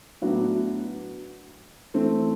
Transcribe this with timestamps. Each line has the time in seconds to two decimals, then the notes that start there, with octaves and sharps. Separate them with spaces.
0.22 A2 F#3 B3 D4 F#4
1.94 E3 A3 C4